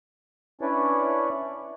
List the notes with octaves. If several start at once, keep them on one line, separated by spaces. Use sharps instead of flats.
C#4 D4 E4 B4 C#5 D5